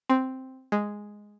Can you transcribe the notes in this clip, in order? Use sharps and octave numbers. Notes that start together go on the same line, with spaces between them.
C4
G#3